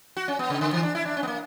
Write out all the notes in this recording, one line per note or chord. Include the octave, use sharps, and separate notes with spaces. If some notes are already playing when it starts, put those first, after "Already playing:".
F#4
C#4
B3
C#3
D3
E3
D4
E4
D4
C#4
B3
A#3